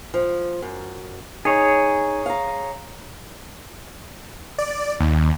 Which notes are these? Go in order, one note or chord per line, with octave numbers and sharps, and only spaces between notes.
F3
F#2
D#4 G#4 C#5
F5 A#5
D5
D#2